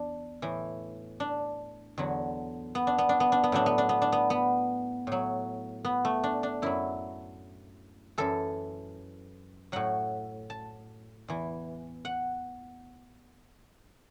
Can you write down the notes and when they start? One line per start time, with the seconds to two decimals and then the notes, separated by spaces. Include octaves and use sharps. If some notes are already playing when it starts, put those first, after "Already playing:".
Already playing: E2 D4
0.42 A2 E3
1.20 D4
1.98 E2 D3 F#3
2.75 B3
2.87 D4
2.98 B3
3.09 D4
3.20 B3
3.32 D4
3.44 B3
3.52 A2 F#3 D4
3.66 B3
3.78 D4
3.89 B3
4.02 D4
4.12 B3
4.30 B3
5.07 A2 F#3
5.85 B3
6.05 A3
6.24 D4
6.43 D4
6.62 F#2 F#3 E4
8.18 F#2 E3 A4
9.72 A2 F#3 F#5
10.50 A5
11.28 E2 E3
12.05 F#5